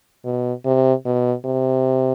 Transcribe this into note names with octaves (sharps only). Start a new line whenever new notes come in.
B2
C3
B2
C3